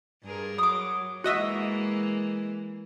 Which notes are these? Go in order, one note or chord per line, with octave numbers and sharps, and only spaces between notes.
G2 G#4 A#4
F#3 D6 D#6
E3 G#3 A#3 F#4 D#5 E5